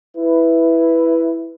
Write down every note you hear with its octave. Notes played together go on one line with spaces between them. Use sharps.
E4 B4